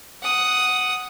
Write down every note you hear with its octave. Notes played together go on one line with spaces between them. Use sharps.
F#5 D#6